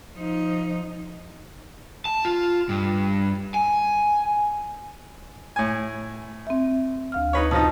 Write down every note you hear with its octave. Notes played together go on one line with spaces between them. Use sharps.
F3 D#4
A5
F4
G2
G#5
A2 G#5
C4 E5
D2 F5 F6
D#4 B4 C#5
B2 F3 D#4 A5